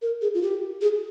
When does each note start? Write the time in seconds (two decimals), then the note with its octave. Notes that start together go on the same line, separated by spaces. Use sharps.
0.02 A#4
0.22 G#4
0.34 F4
0.42 G4
0.81 G#4